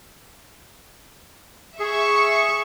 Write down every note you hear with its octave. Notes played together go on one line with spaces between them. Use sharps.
G#4 E5 C#6